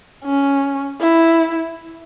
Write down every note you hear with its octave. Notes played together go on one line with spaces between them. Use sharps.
C#4
E4